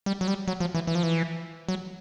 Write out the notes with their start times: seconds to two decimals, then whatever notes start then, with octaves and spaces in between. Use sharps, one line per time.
0.06 G3
0.21 F#3
0.28 G3
0.48 F#3
0.60 F3
0.75 E3
0.87 E3
0.95 F3
1.03 E3
1.68 F#3